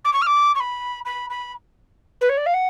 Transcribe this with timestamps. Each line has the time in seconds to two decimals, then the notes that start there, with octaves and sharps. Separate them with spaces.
0.04 D6
0.13 C#6
0.21 F6
0.26 D6
0.55 C#6
0.60 B5
1.05 B5
1.29 B5
2.21 B4
2.29 C#5
2.37 D5
2.46 F5
2.53 F#5